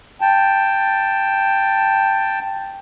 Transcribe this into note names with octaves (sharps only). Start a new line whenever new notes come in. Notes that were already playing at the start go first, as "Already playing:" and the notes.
G5 A5